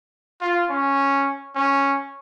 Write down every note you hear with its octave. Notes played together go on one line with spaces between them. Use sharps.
F4
C#4
C#4